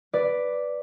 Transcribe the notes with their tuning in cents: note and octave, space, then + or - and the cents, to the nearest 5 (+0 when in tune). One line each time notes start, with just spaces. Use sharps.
B4 +0 D5 +0